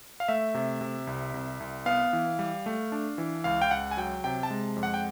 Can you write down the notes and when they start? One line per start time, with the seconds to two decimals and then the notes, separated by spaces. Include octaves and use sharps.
0.20 F5
0.28 A3 E5
0.55 C3
0.81 C3
1.07 C2
1.34 C2
1.60 C2
1.86 B3 F5
2.13 E3
2.39 G3
2.66 A3
2.92 D4
3.18 E3
3.44 C#2 F5
3.62 G5
3.71 C#2 F#5
3.91 G#5
3.97 F#3 G5
4.24 C3 G5
4.43 A5
4.50 G#3
4.76 F2
4.83 F#5
4.94 G5